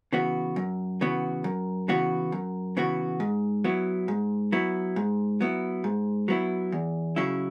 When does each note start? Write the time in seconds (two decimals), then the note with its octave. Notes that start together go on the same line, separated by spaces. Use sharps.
0.13 C#3 E3 B3 F#4
0.56 F#2
1.01 C#3 E3 B3 F#4
1.44 F#2
1.88 C#3 E3 B3 F#4
2.32 F#2
2.77 C#3 E3 B3 F#4
3.20 G#2
3.64 F#3 B3 E4
4.08 G#2
4.52 F#3 B3 E4
4.96 G#2
5.41 F#3 B3 E4
5.84 G#2
6.28 F#3 B3 E4
6.72 E2
7.16 C#3 F#3 C#4 E4